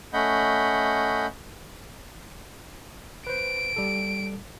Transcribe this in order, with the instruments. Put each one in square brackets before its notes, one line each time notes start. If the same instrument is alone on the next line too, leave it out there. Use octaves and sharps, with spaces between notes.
[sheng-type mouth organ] A3 C#4 D#5 F#5 B5 G6
[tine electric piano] B4 C5 [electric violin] D7
[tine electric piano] G3 A4